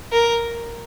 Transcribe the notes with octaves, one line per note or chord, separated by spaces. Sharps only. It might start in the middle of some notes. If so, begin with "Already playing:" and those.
A#4